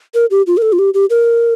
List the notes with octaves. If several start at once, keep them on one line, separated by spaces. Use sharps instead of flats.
A#4
G4
F4
A#4
A4
F4
G4
G4
A#4